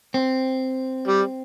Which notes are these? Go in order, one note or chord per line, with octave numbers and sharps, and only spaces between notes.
C4
G3